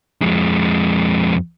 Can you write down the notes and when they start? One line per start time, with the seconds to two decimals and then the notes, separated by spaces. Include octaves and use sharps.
0.21 F2 G#3